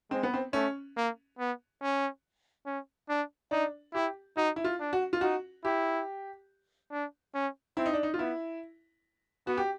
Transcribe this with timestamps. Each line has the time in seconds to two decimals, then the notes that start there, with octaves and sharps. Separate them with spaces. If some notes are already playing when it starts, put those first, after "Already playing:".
0.11 G#3 C4
0.23 B3
0.34 C4
0.53 A3 C#4
0.97 A#3
1.39 B3
1.82 C#4
2.66 C#4
3.09 D4
3.51 D4 D#4
3.94 E4 G4
4.37 D#4 F#4
4.56 E4
4.64 F4
4.80 D4
4.93 F#4
5.13 F4
5.21 D#4 F#4
5.64 E4 G4
6.92 D4
7.34 C#4
7.77 C4 E4
7.86 D#4
7.93 D4
8.03 D#4
8.14 F4
8.19 B3 E4
9.47 B3 F#4
9.57 G4